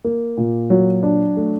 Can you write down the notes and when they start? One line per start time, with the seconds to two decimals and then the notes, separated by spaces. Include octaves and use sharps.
0.04 A#3
0.37 A#2
0.70 F#3
1.03 D4
1.37 A3